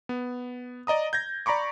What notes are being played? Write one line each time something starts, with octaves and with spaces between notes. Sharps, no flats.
B3
D5 D#5 A#5 D#6
G6 G#6 A#6
D5 A#5 B5 C#6 D6